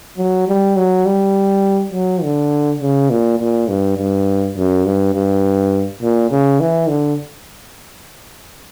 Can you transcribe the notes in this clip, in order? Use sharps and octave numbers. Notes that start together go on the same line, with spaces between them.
F#3
G3
F#3
G3
F#3
D3
C#3
A#2
A#2
G2
G2
F#2
G2
G2
A#2
C#3
E3
D3